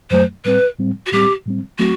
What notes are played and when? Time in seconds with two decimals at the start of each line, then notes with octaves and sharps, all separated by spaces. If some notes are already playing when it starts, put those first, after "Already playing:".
0.11 F#2 F#3 A3 C5
0.45 A2 G3 C4 B4
0.78 A2 G3 C4
1.06 F#4
1.12 A2 G3 C4 G4
1.45 A2 G3 C4
1.79 F#3 A3 C4 F#4